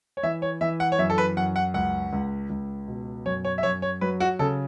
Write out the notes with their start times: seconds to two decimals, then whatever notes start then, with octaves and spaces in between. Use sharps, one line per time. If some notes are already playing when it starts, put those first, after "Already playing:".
0.17 C#5
0.23 E3 E5
0.42 C#5
0.61 E3 E5
0.80 F#5
0.92 C#5
0.99 F#2 E5
1.10 A4
1.18 B4
1.37 F#2 F#5
1.56 F#5
1.74 C#2 F#5
2.13 C#2
2.50 C#2
2.88 B2
3.26 F#2 C#5
3.45 C#5
3.58 E5
3.63 F#2 C#5
3.82 C#5
4.01 F#3 B4
4.20 F#4
4.39 C#3 A4